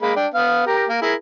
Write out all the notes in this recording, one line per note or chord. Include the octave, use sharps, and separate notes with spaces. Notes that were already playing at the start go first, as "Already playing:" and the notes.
G#3 A#3 B5
D4 G5
B3 F5
G4 A#4
A#3
E4 G#4 A#4